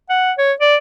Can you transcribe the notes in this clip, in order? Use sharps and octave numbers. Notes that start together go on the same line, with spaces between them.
F#5
C#5
D5